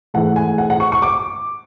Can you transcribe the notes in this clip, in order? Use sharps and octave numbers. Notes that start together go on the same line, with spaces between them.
G#2 E3 A3 F#5
G#5
F#5
F#5
C#6
C#6
D6